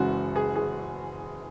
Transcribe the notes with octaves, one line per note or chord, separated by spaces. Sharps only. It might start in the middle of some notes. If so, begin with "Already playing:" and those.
Already playing: F#1 F#2 E3 G#3 F#4
G#4
G#4